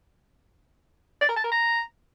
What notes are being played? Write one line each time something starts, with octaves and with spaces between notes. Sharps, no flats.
D5
A#4
A5
A#4
A#5